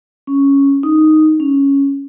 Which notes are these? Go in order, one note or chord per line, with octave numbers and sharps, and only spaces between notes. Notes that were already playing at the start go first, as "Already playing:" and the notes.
C#4
D#4
C#4